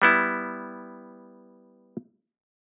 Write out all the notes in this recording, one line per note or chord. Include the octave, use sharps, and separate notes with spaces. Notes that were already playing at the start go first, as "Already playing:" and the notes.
G3 B3 E4